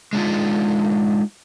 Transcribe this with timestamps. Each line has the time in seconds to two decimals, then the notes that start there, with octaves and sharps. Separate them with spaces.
0.13 G#3 D4 D#4 F4